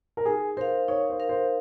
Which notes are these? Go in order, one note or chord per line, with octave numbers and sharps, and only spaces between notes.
A#4
D#4 G#4
A#4 C5 F5
D#4 C#5
C5
A#4 F5
C5